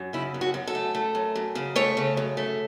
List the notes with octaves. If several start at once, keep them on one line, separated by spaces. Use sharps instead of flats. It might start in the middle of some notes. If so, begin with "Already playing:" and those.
Already playing: F#2
C#3 E4
F#2
F#4
F#2
A4
A3
A3
F#2
F#2
C#3
A3 C#5
C#3
F#2
A3